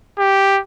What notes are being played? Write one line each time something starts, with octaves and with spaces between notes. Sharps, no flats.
G4